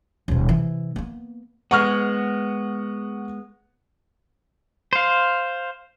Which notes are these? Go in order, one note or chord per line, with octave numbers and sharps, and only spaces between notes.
D#1 B2
C3 E3
A#3 B3
G#3 B3 F#5 C#6 F6
C5 F5